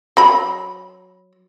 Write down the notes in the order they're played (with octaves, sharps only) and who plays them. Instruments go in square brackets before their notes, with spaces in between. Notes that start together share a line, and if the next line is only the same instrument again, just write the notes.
[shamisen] F#3 B5